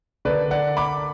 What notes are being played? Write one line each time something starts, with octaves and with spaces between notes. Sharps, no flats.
D3 A#3 D4 B4 D5
D5 F#5
B5 D6